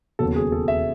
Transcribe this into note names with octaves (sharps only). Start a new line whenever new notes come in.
E1 D#2 C#3 F#3 B3 A4
G#4
A4
E5